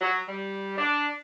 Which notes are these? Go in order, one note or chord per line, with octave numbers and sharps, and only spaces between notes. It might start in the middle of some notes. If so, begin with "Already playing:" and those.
F#3
G3
D4